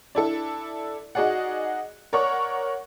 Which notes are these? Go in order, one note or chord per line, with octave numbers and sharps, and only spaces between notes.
D4 E4 A4
D#4 F#4 G#4 D5 F#5
A#4 C#5 D5 F#5 C#6